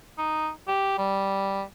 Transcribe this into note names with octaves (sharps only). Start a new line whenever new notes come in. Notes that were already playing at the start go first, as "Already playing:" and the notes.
D#4
G4
G3